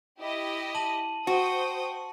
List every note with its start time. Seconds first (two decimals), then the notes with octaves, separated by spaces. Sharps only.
0.19 E4 G4 D#5
0.75 A5 D#7 F#7
1.27 F#4 C5 G5 D#6 C#7